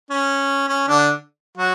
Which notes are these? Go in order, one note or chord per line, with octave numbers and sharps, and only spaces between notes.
C#4
C#4
D3 D4
F#3 F#4